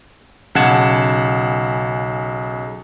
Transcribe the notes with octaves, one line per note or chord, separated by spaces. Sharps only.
B1 C#3 F#5 A5 G#6 E7